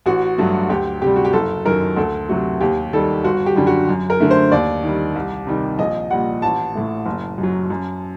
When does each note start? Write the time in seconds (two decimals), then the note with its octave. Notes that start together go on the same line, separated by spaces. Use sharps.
0.06 A1 F#4
0.38 G2 F#3 A3
0.69 D2 G4
1.02 C3 G3 G4
1.16 F#4
1.25 G4
1.33 F#1 A4
1.65 F#2 D#3 F#3 A#4
1.97 D2 A4
2.29 C3 F#3 A3 F#4
2.60 D#2 G4
2.93 D#3 G3 A4
3.24 G1 F#4
3.46 G4
3.56 F#2 D3 G3
3.67 F#4
3.89 F#2
4.10 A#4
4.20 D3 A3
4.31 C5
4.52 D#2 D5
4.83 D#3 G3
5.16 C2
5.47 C3 D#3 G3
5.79 A#1 D#5
6.10 A#2 G3 F#5
6.42 A1 A5
6.75 A2 A3
7.06 F#1
7.38 F#2
7.43 F#3
7.70 F#2